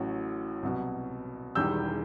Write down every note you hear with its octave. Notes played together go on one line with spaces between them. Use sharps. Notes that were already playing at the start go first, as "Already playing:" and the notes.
Already playing: A1 A2 F#3
C2 B2 F#3
E1 E2 D#3 G3 E6 G6